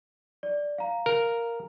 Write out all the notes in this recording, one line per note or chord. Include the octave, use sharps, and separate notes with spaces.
D5
F5 A#5
A#4